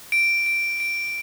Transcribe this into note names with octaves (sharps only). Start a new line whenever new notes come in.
D7
D7
D7